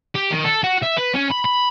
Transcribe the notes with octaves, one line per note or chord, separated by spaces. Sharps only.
G4
D#3
A4
F#4
E5
B4
C#4
B5
B5